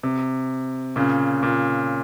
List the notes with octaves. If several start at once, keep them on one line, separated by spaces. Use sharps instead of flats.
C3
A#2 C#3
A#2